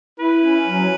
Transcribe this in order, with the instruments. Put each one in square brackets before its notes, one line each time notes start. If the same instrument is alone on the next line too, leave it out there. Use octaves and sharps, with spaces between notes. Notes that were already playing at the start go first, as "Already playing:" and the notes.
[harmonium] E4 [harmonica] B4
[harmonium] C#4
F#3